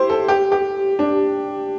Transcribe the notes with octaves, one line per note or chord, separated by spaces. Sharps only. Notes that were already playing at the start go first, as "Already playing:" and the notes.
Already playing: E4 G4 C5
A4
G4
G4
D4